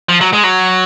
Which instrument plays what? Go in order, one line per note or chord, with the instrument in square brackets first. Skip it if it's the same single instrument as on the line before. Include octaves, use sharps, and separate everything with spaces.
[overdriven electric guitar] F3
F#3
G#3
F#3